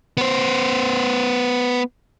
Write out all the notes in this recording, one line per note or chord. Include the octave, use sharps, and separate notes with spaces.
B3 C5